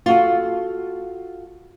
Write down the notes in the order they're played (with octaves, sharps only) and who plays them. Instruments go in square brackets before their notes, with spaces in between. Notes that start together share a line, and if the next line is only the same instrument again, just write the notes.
[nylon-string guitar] F4 F#4 A4